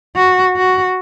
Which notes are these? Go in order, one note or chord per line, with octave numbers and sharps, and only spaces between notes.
F#4
F#4